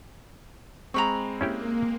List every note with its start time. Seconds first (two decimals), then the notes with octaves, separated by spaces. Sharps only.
0.94 G#3 C4 A#5 B5 C#6
1.41 A#3 C#4 E4 G4